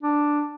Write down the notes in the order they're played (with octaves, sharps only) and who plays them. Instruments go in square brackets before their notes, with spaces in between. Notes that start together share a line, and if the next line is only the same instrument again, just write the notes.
[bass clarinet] D4